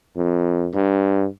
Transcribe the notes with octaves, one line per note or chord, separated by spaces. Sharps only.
F2
G2